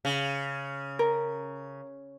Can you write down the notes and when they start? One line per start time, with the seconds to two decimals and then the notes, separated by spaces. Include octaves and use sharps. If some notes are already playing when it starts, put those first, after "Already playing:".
0.05 C#3
0.99 A#4